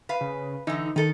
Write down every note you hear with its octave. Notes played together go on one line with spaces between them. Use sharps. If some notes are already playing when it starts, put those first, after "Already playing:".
B4 F5
C#3
D3 E3 D#4
D#3 D#4 A4